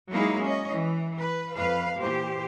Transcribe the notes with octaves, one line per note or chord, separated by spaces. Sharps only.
F#3 G#3 A#3 D#4 E4 G#4
C#4 D#5
E3
B4
F2 B4 F5
A#2 E3 G4 C5